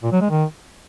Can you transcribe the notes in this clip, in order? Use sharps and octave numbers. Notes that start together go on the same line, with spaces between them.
A#2
F#3
G#3
D#3